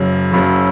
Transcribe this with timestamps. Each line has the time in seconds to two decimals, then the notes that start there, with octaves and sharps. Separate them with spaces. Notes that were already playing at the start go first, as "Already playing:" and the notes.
Already playing: F#1 F#2 C#3 F#3
0.32 F#1 F#2 C#3 F#3